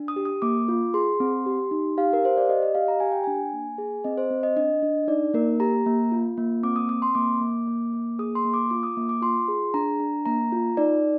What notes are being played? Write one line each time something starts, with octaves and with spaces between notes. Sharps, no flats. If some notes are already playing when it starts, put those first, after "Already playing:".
Already playing: D4
D#6
G4
D#6
A#3 D6
F4
G#4 C6
C4
G4
D#4
G4 F5
A#4
G4 C5
D5
G4 D#5
D#5
G4 F5
A#5
G4 G#5
G5
D4 G#5
A#3
G#4
C4 D#5
C5
C4
D#5
D4 D#5
D4
D#4 D5
A#3 A#4
G4 A#5
A#3
F4
A#3
C4 D6
D#6
C4 D#6
C6
A#3 D6
A#3
A#3
A#3
G#4 D#6
C6
A#3
D6
F4 D6
D#6
A#3
D6
F4 C6
G#4
D4 A#5
D4
A#3 A#5
F4
D#4 D5